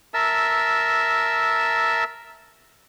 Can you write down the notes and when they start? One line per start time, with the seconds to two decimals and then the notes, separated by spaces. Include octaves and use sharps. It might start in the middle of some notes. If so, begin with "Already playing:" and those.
0.14 A#4 E5 A5 E6